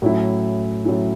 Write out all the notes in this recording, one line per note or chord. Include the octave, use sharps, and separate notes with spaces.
A2 F#3 C#4 E4
A2 F#3 C#4 E4